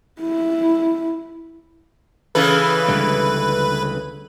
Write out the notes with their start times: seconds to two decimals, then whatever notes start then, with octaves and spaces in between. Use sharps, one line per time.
0.22 E4
2.35 C#3 E3 A4 B4
2.88 C#2 D3 G3